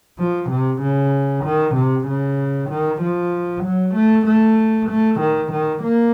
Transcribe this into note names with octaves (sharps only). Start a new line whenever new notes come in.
F3
C3
C#3
D#3
C3
C#3
D#3
F3
F#3
A3
A3
A3
D#3
D#3
A#3